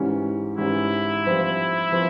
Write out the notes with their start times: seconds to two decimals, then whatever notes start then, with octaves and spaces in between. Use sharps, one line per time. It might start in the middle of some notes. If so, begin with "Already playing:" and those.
Already playing: G#2 E3 G3 C#4
0.57 G#2 E3 G3 C#4 E4
1.25 G2 F3 C4 F4
1.92 F3 C4 F4